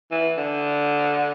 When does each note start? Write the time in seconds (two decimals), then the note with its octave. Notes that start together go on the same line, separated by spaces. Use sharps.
0.11 E3
0.37 D3